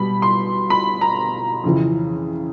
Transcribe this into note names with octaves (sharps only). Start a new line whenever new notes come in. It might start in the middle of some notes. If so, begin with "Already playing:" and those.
Already playing: B2 G3 B5
C6
B5
A#5
F2 C#3 E3